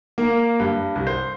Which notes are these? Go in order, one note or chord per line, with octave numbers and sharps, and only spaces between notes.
A#3
G2
C2
C5